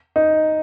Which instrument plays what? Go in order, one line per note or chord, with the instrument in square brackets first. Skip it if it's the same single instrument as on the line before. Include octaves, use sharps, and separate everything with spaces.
[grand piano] D#4